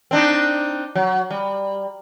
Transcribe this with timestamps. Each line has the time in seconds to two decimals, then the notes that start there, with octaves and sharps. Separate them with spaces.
0.11 C4 D4 D#4
0.95 F#3
1.30 G3